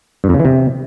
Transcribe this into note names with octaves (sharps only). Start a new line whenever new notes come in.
G2
F2
C#3
E3
C3